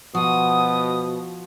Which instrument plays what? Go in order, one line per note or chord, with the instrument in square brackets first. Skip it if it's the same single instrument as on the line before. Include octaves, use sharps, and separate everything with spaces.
[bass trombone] B2 [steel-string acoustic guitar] F3 [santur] F#4 [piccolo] D#6